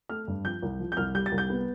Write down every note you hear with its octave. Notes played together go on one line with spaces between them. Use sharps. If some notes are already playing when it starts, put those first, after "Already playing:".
A3 F6
G2
F3 G6
C2
F3
G6
C2 F6
G3 G6
A6
C2
G6
B3